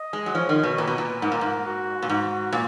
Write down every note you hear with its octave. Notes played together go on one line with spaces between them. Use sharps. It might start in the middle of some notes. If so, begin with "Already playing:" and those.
Already playing: D#5
G#3
F#3
F3 C#5
D#3
B2
A#2 B4
B2
A#2
G#2 A#4
A#2
G#2
F#4
A#2
G#2 F#4
A#2